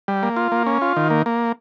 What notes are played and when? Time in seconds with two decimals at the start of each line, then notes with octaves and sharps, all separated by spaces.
0.08 G3
0.23 A#3
0.36 F4
0.52 A#3
0.67 C#4
0.82 F4
0.96 D#3
1.10 A#3
1.26 A#3